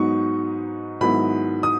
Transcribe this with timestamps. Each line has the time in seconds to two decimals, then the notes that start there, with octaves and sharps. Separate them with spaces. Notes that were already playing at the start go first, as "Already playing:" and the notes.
Already playing: G#2 F#3 B3 D#4 C#6
1.01 G#2 D#3 F#3 B3 E4 B5
1.63 D#6